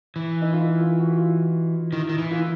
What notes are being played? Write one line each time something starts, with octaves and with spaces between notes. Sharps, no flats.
E3
D#4
F4
E4
F4
F#4
F4
D#3 E4
D#3
E3
F4
E4